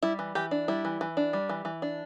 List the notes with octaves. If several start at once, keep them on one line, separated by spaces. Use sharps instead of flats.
G3 E4
E3
E3 G4
D4
G3 E4
E3
E3
D4
G3
E3
E3
D4